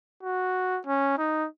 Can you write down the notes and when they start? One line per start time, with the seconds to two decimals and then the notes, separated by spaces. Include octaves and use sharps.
0.23 F#4
0.87 C#4
1.18 D#4